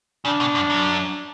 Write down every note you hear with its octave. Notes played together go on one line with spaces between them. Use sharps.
C#3 D4
B2
F#2
F#2